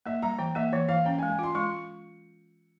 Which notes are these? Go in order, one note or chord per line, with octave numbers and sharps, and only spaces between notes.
A#3 E5
G3 A#5
E3 G5
A#3 E5
E3 C#5
E3 F5
C#4 G5
G#5
G#3
G#5
F4 C6
G#3 C#6